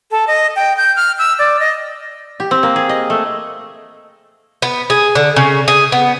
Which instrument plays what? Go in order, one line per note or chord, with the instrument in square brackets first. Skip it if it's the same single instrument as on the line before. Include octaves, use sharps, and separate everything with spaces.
[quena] A4
D#5
G5
G6
F6
E6
D5
D#5
[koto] G4
C4
A#3
G#4
D#5
A3
[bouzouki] B3
G#4
D3
C#3
G#4
B3